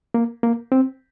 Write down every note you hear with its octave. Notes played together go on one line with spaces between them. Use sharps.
A#3
A#3
C4